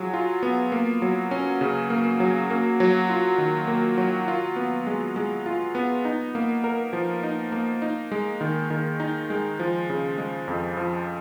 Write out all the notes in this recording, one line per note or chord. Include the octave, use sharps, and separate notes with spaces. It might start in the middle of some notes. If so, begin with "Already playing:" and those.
Already playing: F#3 F4 G#4
F4
B3
A#3
F#3
C#4
C#3
A#3
F#3
A#3
F#3
F4
D#3
A#3
F#3
F4
B3
G#3
G#3
F4
B3
D#4
A#3
A#4
F3
D#4
A#3
D#4
G#3
D#3
D#3
D#4
G#3
F3
C#3
G#3
F2
F3